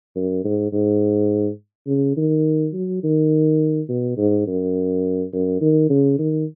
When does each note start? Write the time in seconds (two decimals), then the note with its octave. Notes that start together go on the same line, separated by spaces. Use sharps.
0.16 F#2
0.45 G#2
0.72 G#2
1.87 C#3
2.17 D#3
2.74 F#3
3.03 D#3
3.89 B2
4.17 G#2
4.47 F#2
5.33 F#2
5.61 D#3
5.89 C#3
6.18 D#3